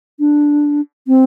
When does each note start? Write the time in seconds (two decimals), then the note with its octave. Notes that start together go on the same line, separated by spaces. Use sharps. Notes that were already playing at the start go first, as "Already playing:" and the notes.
0.20 D4
1.08 C4